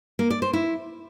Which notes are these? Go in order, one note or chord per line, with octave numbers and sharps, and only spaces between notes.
A#3
D5
C5
E4